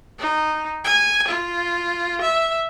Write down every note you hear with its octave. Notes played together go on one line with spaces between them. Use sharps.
D#4
G#5
F4
E5